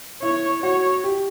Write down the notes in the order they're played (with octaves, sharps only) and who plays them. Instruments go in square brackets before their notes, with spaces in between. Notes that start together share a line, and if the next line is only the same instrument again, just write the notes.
[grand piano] E4 [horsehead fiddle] C#5
[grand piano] F#4 [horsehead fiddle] C#5
[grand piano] G4